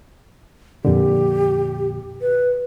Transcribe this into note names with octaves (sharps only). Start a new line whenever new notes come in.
F2 A#2 D3 G4
B4